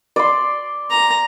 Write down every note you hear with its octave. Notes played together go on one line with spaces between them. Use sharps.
D5 C6
A#5